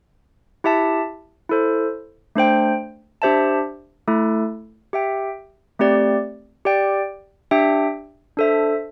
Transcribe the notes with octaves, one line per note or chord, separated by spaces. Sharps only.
E4 G4 E5 A5
E4 A4 C5
A3 D4 C5 G5
D4 G4 C5 E5 A5
A3 E4 A4
G4 E5 G5
A3 C4 G4 D5
G4 D5 G5
D4 G4 E5 G5
D4 A4 C5 E5